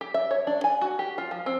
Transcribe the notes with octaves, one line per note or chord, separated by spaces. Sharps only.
G4
E5
C#5
D4
G#5
F#4
G4
F4
F3
C4